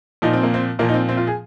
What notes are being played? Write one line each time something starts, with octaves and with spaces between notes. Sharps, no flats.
A#2 F3 D#4
C4
A#3
C4
A#2 F3 A#3
D#4
C4
C4
F4
G#4